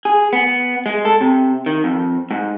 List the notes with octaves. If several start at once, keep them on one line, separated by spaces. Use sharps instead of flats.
G#4
B3
G#3
A4
C3
D#3
F2
G#2